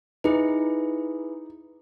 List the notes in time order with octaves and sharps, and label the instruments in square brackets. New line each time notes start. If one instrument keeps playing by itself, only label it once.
[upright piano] D#4 [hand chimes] E4 G#4 B4